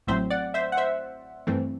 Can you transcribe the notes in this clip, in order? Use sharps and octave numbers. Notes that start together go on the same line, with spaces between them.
A1 A2 F#3 C4 C5 E5
D5 F#5
C5 E5
F#5
C5 E5
G2 E3 A3 C4